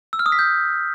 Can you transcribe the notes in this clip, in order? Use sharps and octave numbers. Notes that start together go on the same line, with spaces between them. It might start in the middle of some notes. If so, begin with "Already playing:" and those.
E6
F6
D#6
B6
G6